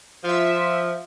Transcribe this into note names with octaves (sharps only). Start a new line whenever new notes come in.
F3 F4 E5